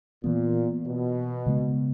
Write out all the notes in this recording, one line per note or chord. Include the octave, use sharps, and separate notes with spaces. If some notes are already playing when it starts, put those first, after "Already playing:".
A#2 E3 B3
B2
C#3 G#3 B3